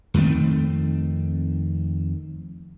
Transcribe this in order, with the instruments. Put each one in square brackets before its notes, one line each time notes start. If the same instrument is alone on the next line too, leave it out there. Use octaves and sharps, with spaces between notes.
[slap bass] F2 D#3 A3 C4